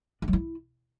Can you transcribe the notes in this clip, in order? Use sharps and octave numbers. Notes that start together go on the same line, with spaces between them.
D4
F#3
E4